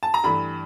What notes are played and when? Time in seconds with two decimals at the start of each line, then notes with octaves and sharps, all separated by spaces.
0.03 A5
0.14 A#5
0.24 G2 E3 A3 B5